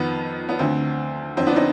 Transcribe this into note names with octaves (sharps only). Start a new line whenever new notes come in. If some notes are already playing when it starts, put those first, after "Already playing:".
Already playing: F2 D#3 B3
B3
D2 D3 C4
F2 D3 C4
B3 D4
C4 D#4